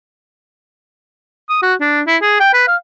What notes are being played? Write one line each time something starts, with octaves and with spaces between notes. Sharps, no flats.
D#6
F#4
D4
E4
G#4
G5
B4
F5